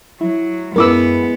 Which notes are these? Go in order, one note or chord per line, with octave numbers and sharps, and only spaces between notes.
F#3 E4
F#2 G#3 B3 E4 A#4 B4 D6 E6